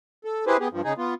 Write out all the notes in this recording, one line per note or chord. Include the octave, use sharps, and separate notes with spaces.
A4
E4 G4 G#4 B4 C5
B3 G4 G#4
G2 F3
C#3 D#4 G#4
B3 F4